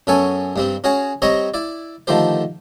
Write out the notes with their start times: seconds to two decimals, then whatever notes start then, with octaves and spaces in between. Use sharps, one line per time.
0.07 F#2 B3 C#4 A4 G#5 C#6
0.56 G2 G3 C4
0.84 C#4 F#4 G#4 C#5
1.22 G3 C4 C#5 D#5 A#5 C#6
1.54 E4 D5
2.07 D3 D#3 F3 A3 G4 C5